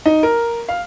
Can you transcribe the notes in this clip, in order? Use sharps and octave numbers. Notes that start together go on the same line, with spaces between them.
D#4
A#4
F5